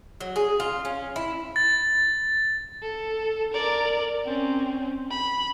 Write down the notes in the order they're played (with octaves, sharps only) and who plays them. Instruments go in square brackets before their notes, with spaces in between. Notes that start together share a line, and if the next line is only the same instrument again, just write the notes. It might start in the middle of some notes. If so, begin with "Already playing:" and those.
[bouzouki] F#3
G#4
F4
C#4
E4
[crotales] A6
[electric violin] A4
A#4 D5
C4 C#4
B5